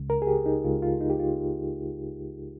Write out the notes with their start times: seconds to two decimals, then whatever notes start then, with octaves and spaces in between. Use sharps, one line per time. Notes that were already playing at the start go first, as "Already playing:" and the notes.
Already playing: C#2 C#3 G#3
0.10 A#4
0.22 G#4
0.27 G4
0.46 D#4
0.64 C#2 C#3 G#3 F4
0.82 F4
1.01 D#4
1.10 G4
1.19 F4